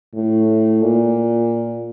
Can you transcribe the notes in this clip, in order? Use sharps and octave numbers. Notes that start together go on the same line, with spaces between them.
A2
A#2